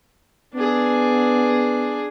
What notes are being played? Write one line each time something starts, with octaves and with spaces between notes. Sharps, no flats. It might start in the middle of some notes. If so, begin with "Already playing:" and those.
B3 D4 G#4